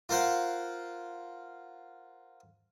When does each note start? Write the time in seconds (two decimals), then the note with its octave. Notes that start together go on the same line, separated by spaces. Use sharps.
0.09 F4 A#4 C5 F5 F#5